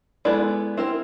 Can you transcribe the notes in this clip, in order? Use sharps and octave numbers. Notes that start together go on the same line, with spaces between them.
G#3 B3 E4 A4 D5
C4 E4 G4 A#4